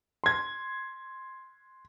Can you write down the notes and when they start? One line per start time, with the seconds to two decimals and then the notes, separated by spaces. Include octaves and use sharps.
0.24 C6 G#6